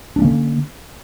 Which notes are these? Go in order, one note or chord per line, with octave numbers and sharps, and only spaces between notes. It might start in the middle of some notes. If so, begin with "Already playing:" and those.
D3 A#3 C#4 D4